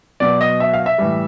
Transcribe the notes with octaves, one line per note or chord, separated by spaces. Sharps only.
B2 F#3 B3 D5
D#5
E5
F5
E5
A2 E3 G3